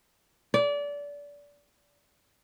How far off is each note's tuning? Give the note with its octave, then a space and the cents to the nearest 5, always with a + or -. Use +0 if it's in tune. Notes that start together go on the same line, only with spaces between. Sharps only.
D5 -25